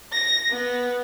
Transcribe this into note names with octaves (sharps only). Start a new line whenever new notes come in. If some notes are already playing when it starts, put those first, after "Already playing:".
A#6
B3